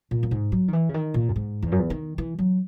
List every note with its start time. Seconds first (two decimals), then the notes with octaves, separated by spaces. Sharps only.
0.11 A#2
0.23 F#2
0.31 G#2
0.52 F#3
0.68 D#3
0.73 E3
0.89 C#3
0.94 D#3
1.14 A#2
1.29 F#2
1.36 G#2
1.62 E2
1.72 F#2
1.79 E2
1.90 D#3
2.18 E3
2.39 F#3